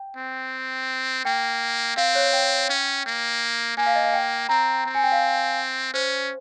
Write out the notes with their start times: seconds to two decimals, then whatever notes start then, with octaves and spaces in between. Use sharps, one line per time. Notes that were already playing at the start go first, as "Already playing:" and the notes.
Already playing: G5
0.17 C4
1.25 A#3 G5
1.97 C4 F5
2.15 C#5
2.33 G5
2.69 C#4
3.06 A#3
3.77 A#3 G#5
3.86 F5
3.95 D#5
4.04 F5
4.13 G5
4.49 C4 A#5
4.85 C4
4.95 G#5
5.03 G5
5.12 F5
5.94 C#4 C5